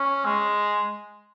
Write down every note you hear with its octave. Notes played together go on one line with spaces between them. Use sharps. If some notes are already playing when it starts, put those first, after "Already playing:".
Already playing: C#4
G#3